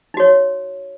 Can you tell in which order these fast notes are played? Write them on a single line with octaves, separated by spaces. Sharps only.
D#4 F#4 C#5